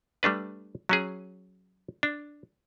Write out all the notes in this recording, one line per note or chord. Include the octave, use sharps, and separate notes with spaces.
G3 A3 D4 B4
F#3 C#4 G#4
D4